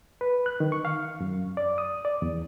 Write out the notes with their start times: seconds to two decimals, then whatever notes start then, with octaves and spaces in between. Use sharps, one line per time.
0.21 B4
0.46 F#6
0.60 D#3
0.72 C#6
0.85 F5
1.20 F#2
1.57 D5
1.78 D#6
2.05 D5
2.22 E2